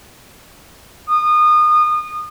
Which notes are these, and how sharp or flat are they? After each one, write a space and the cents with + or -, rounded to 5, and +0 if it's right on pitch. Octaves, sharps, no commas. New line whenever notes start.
D#6 -30